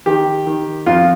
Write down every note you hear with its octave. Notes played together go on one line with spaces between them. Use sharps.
D#3 G4
D#3
F2 F4